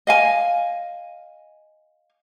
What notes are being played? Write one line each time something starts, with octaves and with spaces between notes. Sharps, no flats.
D#5 F5 G#5